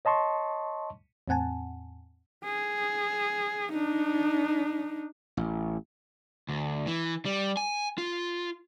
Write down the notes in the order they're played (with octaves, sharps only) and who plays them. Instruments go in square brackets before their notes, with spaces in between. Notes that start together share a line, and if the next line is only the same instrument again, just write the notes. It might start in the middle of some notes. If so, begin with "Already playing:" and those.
[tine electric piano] C#5 D#5 A5 C6 C#6
[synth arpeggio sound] E2 A2 C4 F#5 G#5 A5
[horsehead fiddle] G#4
D4 D#4
[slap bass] A1
[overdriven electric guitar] D2
E3
G3
G#5
F4